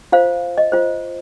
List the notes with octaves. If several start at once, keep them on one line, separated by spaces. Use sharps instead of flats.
F4 C5 F5
D#5
F4 C5